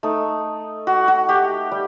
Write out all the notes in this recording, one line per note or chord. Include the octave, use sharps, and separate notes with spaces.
A3 D#4
F#4
F#4
G4
G3